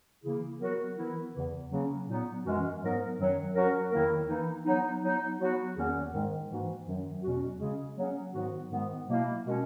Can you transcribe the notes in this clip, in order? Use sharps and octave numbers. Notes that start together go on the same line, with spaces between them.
C#3 E3 A#3 E4 G#4
F#3 B3 F#4 A#4
E3 B3 E4 A#4
E2 C#3 E3
C#3 F#3 A#3 C#4
A#2 F#3 B3 D#4
F#2 E3 G#3 C#4 F#4
G#2 F#3 B3 D#4 A#4
F#2 D#3 F#3
F#3 C#4 F#4 A#4
E2 D#3 A#3 E4 A#4
E3 A#3 D#4
F#3 B3 D#4
F#3 B3 D#4
F#3 B3 F#4
E2 D#3 A#3 C#4 G#4
G#2 D#3 G#3
G#2 E3 A#3 D#4 F#4
F#2 D#3 F#3
E2 B2 F#3 C#4 F#4
C#3 G#3 C#4 G#4
F#3 A#3 C#4 G#4
G#2 D#3 F#3 B3 F#4
G#2 D#3 G#3 B3
B2 F#3 A#3 E4
B2 G#3 C#4 F#4 A#4